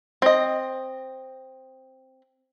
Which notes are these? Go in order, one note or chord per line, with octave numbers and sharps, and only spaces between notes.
C4 D#5